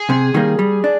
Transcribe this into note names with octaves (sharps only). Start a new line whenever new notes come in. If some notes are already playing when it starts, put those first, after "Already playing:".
Already playing: G#4
C3
D#3 G3 A#3
G3
D4